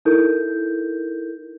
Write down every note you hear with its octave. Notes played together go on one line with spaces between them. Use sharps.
D#4 E4 A4 A#4 G6